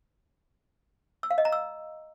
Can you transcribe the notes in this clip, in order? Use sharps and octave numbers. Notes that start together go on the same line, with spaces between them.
E6
F5
D#5
A#5
E6